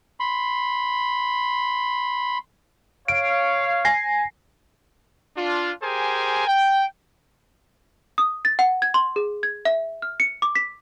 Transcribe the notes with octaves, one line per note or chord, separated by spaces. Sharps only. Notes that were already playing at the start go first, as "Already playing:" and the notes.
B5 C6
C#5 F5 D7
G#5 A#6 C7
D4 F4
G4 G#4 A#4 C5 G#5
G5
D#6
A6
F#5
G#6
C6
G#4
G#6
E5
F6
C#7
D6
B6